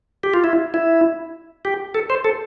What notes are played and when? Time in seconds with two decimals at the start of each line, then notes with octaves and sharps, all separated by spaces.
0.23 G4
0.34 F4
0.44 E4
0.74 E4
1.65 G4
1.95 A4
2.10 C5
2.25 A4